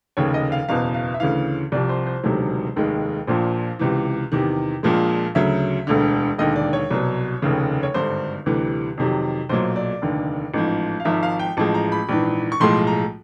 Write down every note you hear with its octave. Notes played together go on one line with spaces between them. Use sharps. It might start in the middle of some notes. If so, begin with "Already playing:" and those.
F1 D#2 C#3 C#5
D#5
F5
F#1 E2 B2 F5
F5
E5
D2 C#3 E3 F5
C2 C3 F3 D5
C5
C5
E1 D2 C3 D#3 F#3
F1 D#2 D#3 G#3
A#1 A#2 F3 C5
C#2 C3 E3
E2 C3 D#3
A#1 A#2 F3 G#3
D2 C#3 F#3 E5
E1 D2 D3
E1 D#2 D3 D#5
D5
C#5
C2 B2 F#3
F1 D#2 C#3
C#5
G#1 G2 D3 C5
D2 C3 E3 G3 B4
F2 C3 D#3 F#3
B1 A#2 F#3 C5
D5
F1 D#2 D3
A1 G#2 F3
F5
G#1 G#2 F3 E5
F5
G5
A1 A2 F3 G#3 A5
A#5
B5
A#1 G#2 E3
C#6
B1 A2 F3 G#3 C6
A#5